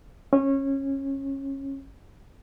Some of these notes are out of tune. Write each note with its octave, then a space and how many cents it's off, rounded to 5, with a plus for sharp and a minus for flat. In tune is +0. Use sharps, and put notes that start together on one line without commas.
C#4 -20